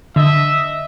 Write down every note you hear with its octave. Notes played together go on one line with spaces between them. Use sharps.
D3 D#5 E5